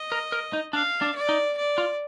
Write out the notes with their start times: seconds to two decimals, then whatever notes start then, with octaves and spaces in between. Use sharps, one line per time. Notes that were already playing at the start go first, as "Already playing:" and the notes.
Already playing: D#5
0.12 A#4
0.32 A#4
0.53 D#4
0.73 D4 F5
1.02 D4
1.15 D5
1.29 D#4
1.57 D5
1.78 F4